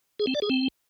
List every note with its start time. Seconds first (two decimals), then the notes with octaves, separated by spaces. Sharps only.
0.19 G#4
0.27 C4
0.35 D5
0.42 G#4
0.50 C4